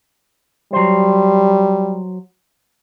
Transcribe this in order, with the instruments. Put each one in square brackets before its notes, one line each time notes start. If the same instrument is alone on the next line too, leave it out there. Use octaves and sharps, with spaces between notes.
[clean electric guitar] F#3 C5 [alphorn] G3